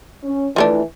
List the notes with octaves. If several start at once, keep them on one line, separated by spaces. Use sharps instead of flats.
C#4
E3 F3 A3 D4